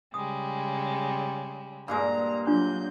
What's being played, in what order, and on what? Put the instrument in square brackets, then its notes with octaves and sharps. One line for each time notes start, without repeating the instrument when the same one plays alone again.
[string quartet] C#3 G3 G#3 [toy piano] D#6
[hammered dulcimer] G2 A#2 G#3 [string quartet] A#5
[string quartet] F#3 G6 [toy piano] D4 F4